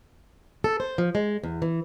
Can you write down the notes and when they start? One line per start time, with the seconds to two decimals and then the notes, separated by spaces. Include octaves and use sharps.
0.64 A4
0.80 C5
0.98 F3
1.15 G#3
1.44 E2
1.62 E3